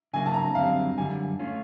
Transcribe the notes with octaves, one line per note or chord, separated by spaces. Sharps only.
C#3 F#3 A#3 G#5
A5
A#5
F#2 D3 G3 C4 F5
F#2 D3 G3 G#5
A3 C#4 F4